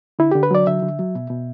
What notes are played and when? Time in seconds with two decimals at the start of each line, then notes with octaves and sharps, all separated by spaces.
0.19 D3 E4
0.31 D3 G4
0.43 B4
0.51 F#3 D5
0.67 D3 E5
0.82 D3
0.99 F#3
1.15 B2
1.30 B2